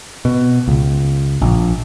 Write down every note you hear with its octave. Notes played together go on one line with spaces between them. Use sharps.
B2
C#2
A#1